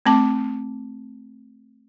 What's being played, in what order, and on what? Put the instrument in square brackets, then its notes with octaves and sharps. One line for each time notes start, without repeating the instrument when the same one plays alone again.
[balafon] A3 C4 A5 D6